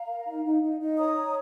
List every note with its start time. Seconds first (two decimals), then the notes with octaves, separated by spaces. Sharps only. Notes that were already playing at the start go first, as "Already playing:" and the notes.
Already playing: F5 A#5
0.09 A#4
0.26 D#4
0.44 D#4
0.62 D#4
0.80 D#4
0.97 C#5 A#5 D#6
1.15 C#5